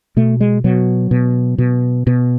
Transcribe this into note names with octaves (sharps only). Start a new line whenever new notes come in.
B2 A3
G#3
B2 F#3
B2
B2
B2